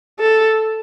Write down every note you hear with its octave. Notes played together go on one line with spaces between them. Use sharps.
A4